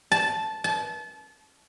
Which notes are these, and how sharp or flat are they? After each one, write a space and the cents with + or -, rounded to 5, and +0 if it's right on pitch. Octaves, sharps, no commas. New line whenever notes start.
A5 -10
A5 -30